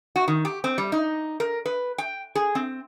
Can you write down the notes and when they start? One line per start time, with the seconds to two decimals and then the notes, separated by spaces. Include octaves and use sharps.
0.16 F#4
0.28 D#3
0.45 G4
0.64 C4
0.78 G3
0.92 D#4
1.40 A#4
1.66 B4
1.98 G5
2.35 G#4
2.55 C4